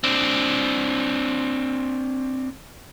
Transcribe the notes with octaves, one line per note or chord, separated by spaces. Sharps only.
C4 D4